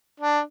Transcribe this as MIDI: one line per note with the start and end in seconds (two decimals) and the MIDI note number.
0.20 0.40 62